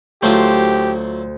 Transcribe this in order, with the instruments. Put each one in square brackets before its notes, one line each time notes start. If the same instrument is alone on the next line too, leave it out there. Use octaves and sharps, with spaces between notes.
[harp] D2 C5 [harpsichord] F#3 A3 F4 [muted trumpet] G4